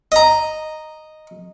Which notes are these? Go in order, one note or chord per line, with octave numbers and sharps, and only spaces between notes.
D#5 A#5